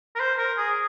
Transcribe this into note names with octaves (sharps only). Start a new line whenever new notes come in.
A#4
C5
A#4
G#4